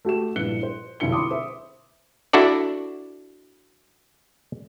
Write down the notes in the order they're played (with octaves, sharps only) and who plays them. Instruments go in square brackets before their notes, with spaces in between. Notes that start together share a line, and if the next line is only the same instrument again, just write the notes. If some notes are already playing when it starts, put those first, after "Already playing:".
[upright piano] A3 F#4 G4 E7
A#1 G2 E4 F#6 C#7 G7
C5
F1 B1 D3 E4 C#7 G7
B5 C6 D6 D#6
C5 E5
[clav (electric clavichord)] D4 E4 F#4 A4 D5